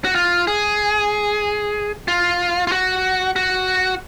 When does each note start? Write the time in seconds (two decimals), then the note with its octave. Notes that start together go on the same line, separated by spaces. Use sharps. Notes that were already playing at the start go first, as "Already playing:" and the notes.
0.04 F#4
0.15 F4
0.47 G#4
2.08 F4
2.67 F4
2.72 F#4
3.36 F#4